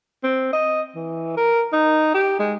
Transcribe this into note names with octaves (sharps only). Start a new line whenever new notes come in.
C4
D#5
E3
A#4
D#4
G4
G#3